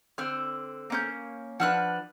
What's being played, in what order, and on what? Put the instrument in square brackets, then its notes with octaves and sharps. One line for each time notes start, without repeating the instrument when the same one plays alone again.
[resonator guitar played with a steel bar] D3 C4 [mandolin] F6
[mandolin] A#3 C#4 G6
[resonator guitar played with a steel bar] F3 D4 B4 [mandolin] F#5 F6 F#6